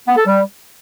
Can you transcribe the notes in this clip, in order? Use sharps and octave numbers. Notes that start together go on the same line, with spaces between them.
B3
A4
G3